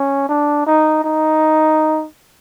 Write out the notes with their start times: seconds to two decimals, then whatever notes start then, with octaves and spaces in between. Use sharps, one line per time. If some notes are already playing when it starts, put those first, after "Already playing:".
Already playing: C#4
0.29 D4
0.66 D#4
1.04 D#4